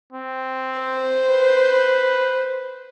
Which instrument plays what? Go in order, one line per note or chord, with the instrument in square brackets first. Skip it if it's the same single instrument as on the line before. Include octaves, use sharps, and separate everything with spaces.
[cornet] C4
[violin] C5
[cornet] B4